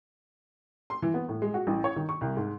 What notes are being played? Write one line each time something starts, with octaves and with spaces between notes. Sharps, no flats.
C6
E3
B3
A2
G#3
F#4
A1
C#5
D#3
C#6
C2
G#2